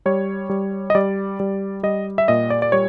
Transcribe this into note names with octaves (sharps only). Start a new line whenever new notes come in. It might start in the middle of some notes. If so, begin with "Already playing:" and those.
G3 C#5
G3
D#5
G3 D5
G3
G3 D#5
E5
A#2 D#5
D5
D5
G3 C#5